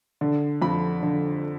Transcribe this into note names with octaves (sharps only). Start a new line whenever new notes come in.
D3
F2 B5
D3